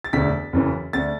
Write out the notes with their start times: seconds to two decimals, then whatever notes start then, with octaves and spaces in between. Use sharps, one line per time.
0.04 A6
0.13 E1 D2 D3 B6
0.53 F#1 F#2 E3
0.93 D2 D3 A6